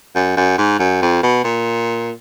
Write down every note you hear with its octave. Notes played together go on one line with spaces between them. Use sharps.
F#2
F#2
G#2
F#2
F2
B2
A#2